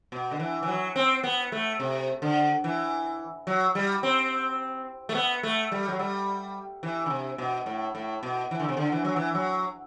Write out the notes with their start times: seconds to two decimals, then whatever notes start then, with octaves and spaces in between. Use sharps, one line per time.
0.12 B2
0.31 D3
0.40 E3
0.63 E3
0.68 F#3
0.96 C4
1.24 B3
1.52 A3
1.80 C3
2.22 D3
2.64 E3
3.47 F#3
3.75 G3
4.03 C4
5.09 A3
5.15 B3
5.43 A3
5.72 G3
5.88 F#3
5.99 G3
6.83 E3
7.06 D3
7.10 C3
7.38 B2
7.66 A2
7.95 A2
8.23 B2
8.51 E3
8.59 D3
8.69 C3
8.77 D3
8.92 E3
9.05 F#3
9.16 E3
9.35 F#3